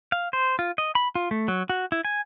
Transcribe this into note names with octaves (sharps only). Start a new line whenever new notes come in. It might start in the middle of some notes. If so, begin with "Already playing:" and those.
F5
C5
F4
D#5
B5
F4
A3
F#3
F#4
E4
G#5